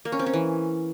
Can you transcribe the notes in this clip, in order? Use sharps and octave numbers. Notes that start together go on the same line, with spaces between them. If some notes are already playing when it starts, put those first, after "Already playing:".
A#3
C#4
C4
C#4
E3